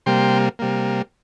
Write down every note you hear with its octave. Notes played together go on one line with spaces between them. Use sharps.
C3 G3 A#3 G5 C6
C3 G3 A#3